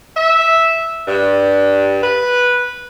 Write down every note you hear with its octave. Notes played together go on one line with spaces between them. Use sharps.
E5
G2
B4